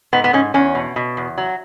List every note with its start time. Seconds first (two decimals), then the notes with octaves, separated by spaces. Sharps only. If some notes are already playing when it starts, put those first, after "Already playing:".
0.13 G#2 B3
0.24 B3
0.33 G#2 C#4
0.54 E2 C#4
0.75 B2
0.96 B2
1.17 E2
1.38 F#3